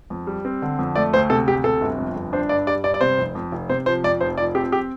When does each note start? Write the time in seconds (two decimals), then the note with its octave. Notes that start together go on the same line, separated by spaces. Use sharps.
0.10 F2
0.27 G3
0.45 C4
0.62 D3
0.79 F2
0.95 A3 D5
1.13 D2 C5
1.30 C3 A4
1.47 D2 G4
1.64 C3 A4
1.81 G1
1.98 F2
2.16 G1
2.33 D4 C5
2.49 G2 D5
2.67 G3 D5
2.84 G2 D5
2.94 D5
3.01 C3 C5
3.19 F1
3.35 F2
3.52 F1
3.69 C3 C5
3.86 F3 C5
4.04 F2 D5
4.21 F1 C5
4.38 F3 D5
4.55 C4 G4
4.72 G4